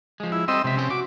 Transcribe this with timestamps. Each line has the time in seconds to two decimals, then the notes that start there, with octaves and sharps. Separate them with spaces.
0.20 F3 G#3
0.32 E4
0.48 G3 C4 A4 D#5 E6
0.64 C#2 C3 E5
0.77 C#4 C6
0.90 F#4 D6